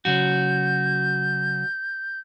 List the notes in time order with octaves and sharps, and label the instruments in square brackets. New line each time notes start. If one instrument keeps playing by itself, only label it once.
[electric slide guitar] C#3 F#3 F#4 [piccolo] G6